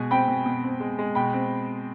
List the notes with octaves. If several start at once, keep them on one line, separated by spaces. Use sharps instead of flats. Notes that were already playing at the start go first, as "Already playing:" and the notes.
Already playing: B2 G#3 G#5
C4 G5 B5
B2
B2
C4
G#3
G#3
B2 G5 B5
C4